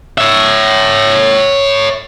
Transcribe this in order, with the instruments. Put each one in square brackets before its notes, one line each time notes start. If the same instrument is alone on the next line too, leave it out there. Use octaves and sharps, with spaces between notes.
[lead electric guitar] C#5 E5